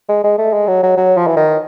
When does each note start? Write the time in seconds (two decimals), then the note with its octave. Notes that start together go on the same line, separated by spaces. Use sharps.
0.09 G#3
0.24 G#3
0.38 A3
0.53 G#3
0.68 F#3
0.83 F#3
0.97 F#3
1.17 F3
1.27 E3
1.36 D#3